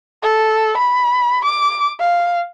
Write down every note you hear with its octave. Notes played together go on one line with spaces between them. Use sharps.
A4
B5
D6
F5